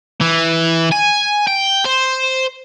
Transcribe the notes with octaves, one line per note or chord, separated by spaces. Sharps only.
E3
G#5
G5
C5